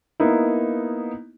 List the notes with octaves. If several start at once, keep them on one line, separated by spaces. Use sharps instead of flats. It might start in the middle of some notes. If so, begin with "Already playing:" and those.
A#3 B3 D#4 E4